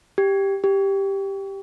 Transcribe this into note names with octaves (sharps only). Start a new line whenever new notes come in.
G4
G4